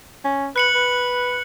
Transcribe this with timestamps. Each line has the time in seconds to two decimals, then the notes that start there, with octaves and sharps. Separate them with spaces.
0.25 C#4
0.56 B4 F#6 C#7 F#7
0.75 B4